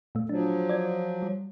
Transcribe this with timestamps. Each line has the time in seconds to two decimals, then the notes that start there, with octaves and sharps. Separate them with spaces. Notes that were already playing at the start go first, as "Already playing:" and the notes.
0.15 A#2 A3
0.29 F3 F#3 D4
0.69 D5 G#6
1.22 G3